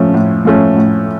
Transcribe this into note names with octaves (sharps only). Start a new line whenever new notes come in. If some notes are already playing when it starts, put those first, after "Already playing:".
Already playing: F3 A3 C#4
A2
F3 A3 C#4
A2